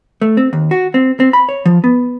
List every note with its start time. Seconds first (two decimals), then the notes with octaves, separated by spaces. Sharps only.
0.21 A3
0.37 C4
0.53 D#2
0.71 F#4
0.94 C4
1.20 C4
1.33 B5
1.49 C#5
1.66 F3
1.84 B3